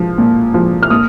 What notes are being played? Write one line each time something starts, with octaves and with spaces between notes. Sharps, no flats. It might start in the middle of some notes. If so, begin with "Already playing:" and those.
Already playing: F3
A#2
F3
F6
A#2 D#6